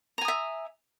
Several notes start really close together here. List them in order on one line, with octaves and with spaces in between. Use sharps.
A#5 G#5 D#6 E5